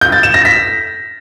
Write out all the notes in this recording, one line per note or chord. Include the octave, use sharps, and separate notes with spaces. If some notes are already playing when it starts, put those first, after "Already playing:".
G6
A6
E7
A#6
B6